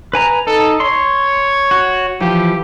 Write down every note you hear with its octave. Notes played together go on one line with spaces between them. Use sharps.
B4 G#5 A#5
D#4 A4
C#5 C6
F#4
E3 F3 G4